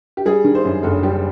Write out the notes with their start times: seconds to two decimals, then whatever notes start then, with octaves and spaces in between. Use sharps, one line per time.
0.17 G4
0.25 G3 G#4
0.44 D#3
0.55 C5
0.65 F#2
0.83 F#1 A4
1.03 G3 G4